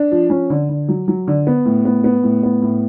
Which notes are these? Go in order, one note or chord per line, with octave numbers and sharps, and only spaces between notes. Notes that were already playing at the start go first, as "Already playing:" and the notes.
Already playing: D4
F3
C#4
D3
D3
F#3
F#3
D3
B3
A2
B3
B3
A2
B3
A2